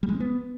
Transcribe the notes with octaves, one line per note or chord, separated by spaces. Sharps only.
G3
G#3
C4
B3